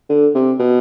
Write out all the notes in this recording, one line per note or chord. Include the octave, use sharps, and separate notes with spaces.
D3
C3
B2